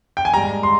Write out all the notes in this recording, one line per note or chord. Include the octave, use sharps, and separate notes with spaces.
G5
G#5
G#2 G3 A#5
C6